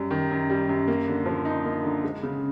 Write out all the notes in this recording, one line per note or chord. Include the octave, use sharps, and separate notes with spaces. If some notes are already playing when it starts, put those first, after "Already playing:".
Already playing: F#2 G3
D#3
F#2
G3
F#2
A#3
D3
F3
D#4
A#3
D3
G#3
C#3